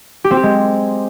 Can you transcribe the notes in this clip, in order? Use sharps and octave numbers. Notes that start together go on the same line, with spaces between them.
G4
C4
G4
G#3